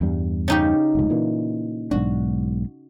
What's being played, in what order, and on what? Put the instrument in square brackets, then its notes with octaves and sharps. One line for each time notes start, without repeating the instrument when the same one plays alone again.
[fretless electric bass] E2 G2 G3
[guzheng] C#3 D#4 G4
[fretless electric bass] F1 C#2
A#2 E3
[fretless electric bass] B1 G#2 D4 [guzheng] F#4